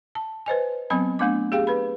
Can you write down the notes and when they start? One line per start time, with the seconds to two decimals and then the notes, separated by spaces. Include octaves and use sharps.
0.15 A5
0.46 B4 C5 D#5 G#5
0.90 F#3 B3 C4 D#5 B5
1.19 A3 B3 D4 D6
1.52 G4 G#4 F5 G5
1.67 B4 B5